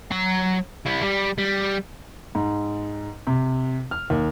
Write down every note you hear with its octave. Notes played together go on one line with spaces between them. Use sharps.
F#3 A#5
G3 E4
G3
G3
G#2
C3
F6
D#2